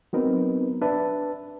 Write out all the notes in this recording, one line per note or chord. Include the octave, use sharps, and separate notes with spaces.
F#3 B3 C4 D#4 A#4 B4
D4 B4 E5 A5